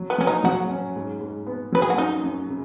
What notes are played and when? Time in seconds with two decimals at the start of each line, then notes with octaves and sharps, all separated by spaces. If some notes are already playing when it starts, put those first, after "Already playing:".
Already playing: F#3
0.10 B3
0.18 F#3 C#4
0.27 D#4
0.44 F#3 F#4
0.70 C#4
0.96 G#2
1.20 G#2
1.47 B3
1.72 F#3 B4
1.82 G#4
1.90 F#4
1.97 F#2 D#4
2.23 F#2
2.49 C#3